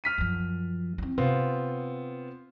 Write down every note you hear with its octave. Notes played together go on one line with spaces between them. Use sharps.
F6 B6 D#7
F#2 F3
C4 E4
C3 B3 C4 F4